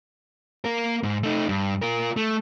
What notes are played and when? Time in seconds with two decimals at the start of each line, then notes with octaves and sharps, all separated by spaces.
0.65 A#3 A#4
1.03 G#2
1.23 A3 D#4
1.49 G2
1.82 F4 A#4
2.17 A3